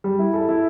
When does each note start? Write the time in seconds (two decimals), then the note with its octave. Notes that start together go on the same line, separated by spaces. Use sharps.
0.04 G3
0.19 E4
0.34 A4
0.49 E4